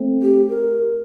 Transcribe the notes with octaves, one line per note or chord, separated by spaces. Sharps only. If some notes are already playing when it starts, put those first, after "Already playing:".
Already playing: A3 C4
G4
A#4